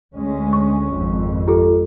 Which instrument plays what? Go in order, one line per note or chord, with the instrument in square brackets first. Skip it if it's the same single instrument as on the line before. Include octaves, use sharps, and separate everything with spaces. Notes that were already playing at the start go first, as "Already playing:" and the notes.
[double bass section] D2 G#3 C#4
[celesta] C#6
[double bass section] G#1 F2
[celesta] F4 G4 A4